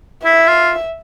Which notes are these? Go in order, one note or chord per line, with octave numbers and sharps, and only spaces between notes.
E4 E5
F4